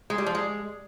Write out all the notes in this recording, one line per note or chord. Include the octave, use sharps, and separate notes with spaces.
G#3
G3
F3
G#3